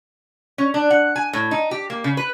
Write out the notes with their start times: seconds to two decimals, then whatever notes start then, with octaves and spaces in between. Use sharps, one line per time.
0.58 C#4
0.74 D4
0.90 F#5
1.16 G#5
1.33 A2
1.51 D#4
1.71 G4
1.90 A#3
2.04 C#3
2.17 B4